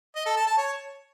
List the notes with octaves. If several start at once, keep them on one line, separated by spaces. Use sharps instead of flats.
D#5
A4
A5
A5
C#5